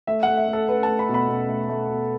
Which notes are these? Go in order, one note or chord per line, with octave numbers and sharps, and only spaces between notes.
A3 E5
A3 F#5
E5
A3
A4
A3 B4
A3 A5
B5
B2
B5
B2
A3
A3
B2